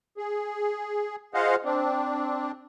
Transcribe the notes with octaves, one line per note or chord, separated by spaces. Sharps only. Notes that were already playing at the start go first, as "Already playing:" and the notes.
G#4
F4 G#4 C5 D#5 F5 F#5
C4 D4